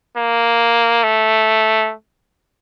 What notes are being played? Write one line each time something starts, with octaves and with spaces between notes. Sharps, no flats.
A#3
A3